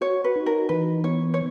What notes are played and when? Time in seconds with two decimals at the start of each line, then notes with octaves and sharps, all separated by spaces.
0.01 F#4 C#5
0.24 B4
0.36 D#4
0.46 A#4
0.69 E3 B4
1.04 B3 C#5
1.34 C#5